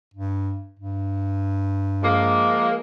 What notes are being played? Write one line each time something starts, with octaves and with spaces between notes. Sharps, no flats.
G2
G2
F3 G#3 A#3